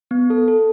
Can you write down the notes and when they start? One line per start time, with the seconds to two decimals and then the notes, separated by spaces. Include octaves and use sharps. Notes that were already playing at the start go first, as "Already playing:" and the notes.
0.11 B3
0.30 A4
0.48 A4